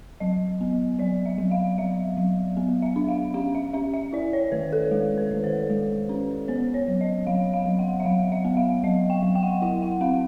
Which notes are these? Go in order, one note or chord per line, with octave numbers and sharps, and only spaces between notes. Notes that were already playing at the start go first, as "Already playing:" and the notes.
F#3 D#5
B3
F#3 D5
E5
F#3
F5
F#3 E5
F#3
B3
E5
D4
F5
C#4 F5
E5
C#4 E5
E5
E4 D5
C#5
D#3 B4
A4
G#3
B4
D#3
C5
G#3
C#4
B3 C5
C#5
F#3
D#5
F#3 F5
F5
F#3
F#5
E5
F#3 F5
E5
B3
F5
F#3 D#5
G5
F#3
G5
F#5
G5
E4 F#5
F#5
C4 F5